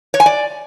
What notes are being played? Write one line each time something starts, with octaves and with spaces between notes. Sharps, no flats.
C#5
G#5
D5